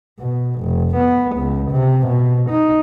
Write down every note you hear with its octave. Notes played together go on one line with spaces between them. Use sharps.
B2
F1
B3
C#2
C3
B2
D#4